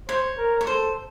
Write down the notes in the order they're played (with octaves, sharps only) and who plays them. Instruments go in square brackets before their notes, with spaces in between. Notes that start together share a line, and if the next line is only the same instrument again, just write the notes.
[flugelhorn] C5 [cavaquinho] C#5
[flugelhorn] A#4
[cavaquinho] C#5
[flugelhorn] A4 [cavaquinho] C5